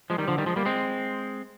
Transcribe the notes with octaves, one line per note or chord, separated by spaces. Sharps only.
F3 G#3
D#3 G3
D3 F3
D#3 G3
F3 G#3
G3 A#3
G#3 C4